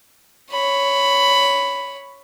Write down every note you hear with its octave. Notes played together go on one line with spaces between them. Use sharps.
C#5 B5